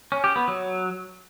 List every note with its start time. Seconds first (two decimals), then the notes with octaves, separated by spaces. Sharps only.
0.12 C#4
0.24 G4
0.36 B3
0.48 F#3